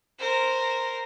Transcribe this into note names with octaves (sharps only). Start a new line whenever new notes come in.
A#4 C5